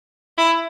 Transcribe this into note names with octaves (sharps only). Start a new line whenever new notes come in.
E4